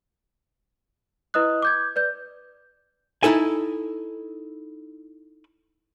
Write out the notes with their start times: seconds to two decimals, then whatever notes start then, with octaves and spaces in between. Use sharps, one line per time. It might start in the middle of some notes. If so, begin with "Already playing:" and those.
1.34 E4 B4 D#5 D#6 F#6
1.62 D6 G6 G#6
1.96 B4 D5 G6
3.23 D#4 E4 A4 G#5